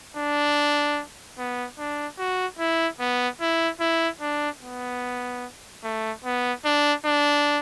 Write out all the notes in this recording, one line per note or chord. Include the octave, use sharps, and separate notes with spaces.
D4
B3
D4
F#4
E4
B3
E4
E4
D4
B3
A3
B3
D4
D4